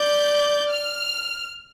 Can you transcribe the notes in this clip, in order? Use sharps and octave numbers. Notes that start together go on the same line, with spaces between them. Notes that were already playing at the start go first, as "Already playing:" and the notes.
Already playing: D5 G6
F6